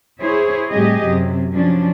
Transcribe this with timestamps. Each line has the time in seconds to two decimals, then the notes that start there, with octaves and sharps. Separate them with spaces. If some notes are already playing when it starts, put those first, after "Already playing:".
0.22 E4 G#4 C5 C#5
0.71 A2 G3 C4 G4 G#4 D#5
1.04 F#2 C3 F#3
1.52 F3 F#3 C#4 D4